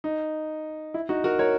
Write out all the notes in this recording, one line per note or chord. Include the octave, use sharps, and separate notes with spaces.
D#4
E4
D#4 F#4
F#4 A#4
A#4 C#5